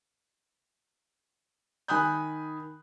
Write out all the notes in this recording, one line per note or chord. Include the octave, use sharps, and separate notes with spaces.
D#3 G#5 B5 D#6 F#6 G6